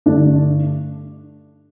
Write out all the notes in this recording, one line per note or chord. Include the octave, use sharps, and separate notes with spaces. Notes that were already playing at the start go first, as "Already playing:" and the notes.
G2 D3 A3 D4